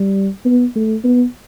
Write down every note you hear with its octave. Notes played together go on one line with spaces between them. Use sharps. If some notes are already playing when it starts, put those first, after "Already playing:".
Already playing: G3
B3
A3
B3